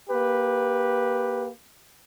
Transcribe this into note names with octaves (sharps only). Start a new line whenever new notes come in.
A#3 G4 B4